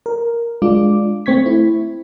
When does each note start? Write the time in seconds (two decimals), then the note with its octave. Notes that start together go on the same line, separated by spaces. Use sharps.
0.06 A#4
0.62 G#3 D4 F4 D6
1.26 A3 C4 C#6 G#6 B6
1.46 E4